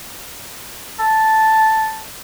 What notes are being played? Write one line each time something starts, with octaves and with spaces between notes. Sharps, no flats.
A5